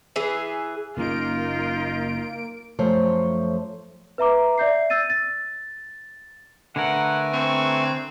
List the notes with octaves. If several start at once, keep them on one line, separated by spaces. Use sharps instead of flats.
E3 G#4
F#1 A2 A#3 C#4 D#4 F4 D7
F#2 F3 A3 C5 C#5
B4 E5 A#5 D6
D5 E5 G6 C7
E6 A6 D#7
A6
D3 A3 A#4 B4 F#5 G#5
C4 C#6